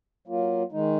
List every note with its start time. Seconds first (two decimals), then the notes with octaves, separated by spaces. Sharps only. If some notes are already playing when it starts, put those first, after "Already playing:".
0.27 F#3 A#3 F4
0.72 D#3 G#3 D#4